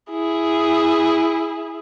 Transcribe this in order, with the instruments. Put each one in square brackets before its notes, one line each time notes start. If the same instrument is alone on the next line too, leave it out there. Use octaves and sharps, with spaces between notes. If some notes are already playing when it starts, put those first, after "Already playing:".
[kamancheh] E4 G#4